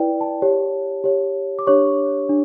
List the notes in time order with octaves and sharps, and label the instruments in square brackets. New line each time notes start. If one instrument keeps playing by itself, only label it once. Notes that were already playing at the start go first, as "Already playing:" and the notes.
Already playing: [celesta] E4 B4 D5 G5
A5
G4 C#5
G4 C#5
D6
D4 G4 C#5 C#6
D4